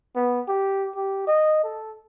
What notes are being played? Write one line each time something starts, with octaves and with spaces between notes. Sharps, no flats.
B3
G4
G4
D#5
A4